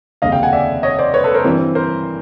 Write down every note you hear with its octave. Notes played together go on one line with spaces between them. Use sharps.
F1 D#2 C#3 D#5 F5
F5 G5
F#5 G#5
D5 E5
C#5 D#5
C5 D5
B4 C#5
A4 B4
A#4 C5
G2 E3 G3 C4
A#4 C5